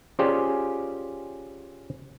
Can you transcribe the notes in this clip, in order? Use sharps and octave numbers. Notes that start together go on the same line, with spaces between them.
C#4 F4 G4 G#4 C5 D5